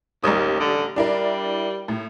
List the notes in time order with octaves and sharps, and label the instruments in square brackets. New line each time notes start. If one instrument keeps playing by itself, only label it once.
[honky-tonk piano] A1 G3 D#6 [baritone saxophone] D#2
[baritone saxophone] D3
[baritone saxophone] G3 [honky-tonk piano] D4 E4 A#4
[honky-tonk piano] A2